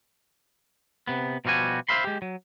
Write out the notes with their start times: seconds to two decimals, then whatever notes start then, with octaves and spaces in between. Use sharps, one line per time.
1.07 C3 B3
1.45 B2 F3 G3 F#4 G#5
1.89 C5 D5 E5 F5 B5 C6
2.04 G#3 G4
2.22 F#3